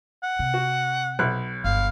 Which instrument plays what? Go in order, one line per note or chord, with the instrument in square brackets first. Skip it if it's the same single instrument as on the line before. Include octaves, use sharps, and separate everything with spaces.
[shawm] F#5
[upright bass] C3
[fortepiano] F#4
B1 F#6
[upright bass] G1 [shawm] F5